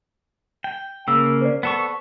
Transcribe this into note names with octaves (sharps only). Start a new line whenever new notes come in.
G5
C#3 A#3 E6
C5 D5
B3 A4 C#6